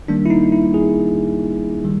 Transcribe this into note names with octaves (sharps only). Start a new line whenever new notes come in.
D#3 G3 A#3 D4
E4
D#4
E4
G#4
D#3 G3